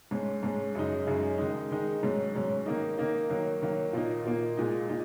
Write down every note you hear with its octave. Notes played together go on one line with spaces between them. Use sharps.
G#2 G#3 C#4
G#2 G#3 C#4
F#2 C#3 G#3 D#4
F#2 C#3 G#3 D#4
D#3 G#3 D#4
D#3 G#3 D#4
G#2 F#3 C#4
G#2 F#3 C#4
D#3 A#3 D#4
D#3 A#3 D#4
D#3 F#3 A#3
D#3 F#3 A#3
A#2 A#3 D#4
A#2 A#3 D#4
A#2 G#3 D#4
A#2 D#4